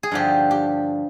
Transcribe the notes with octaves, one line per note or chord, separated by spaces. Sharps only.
G#4
G2 D3 F3 G4
G4